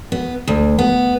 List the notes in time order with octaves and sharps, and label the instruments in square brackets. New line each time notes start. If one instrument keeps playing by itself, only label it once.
[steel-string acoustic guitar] B3
D2
B3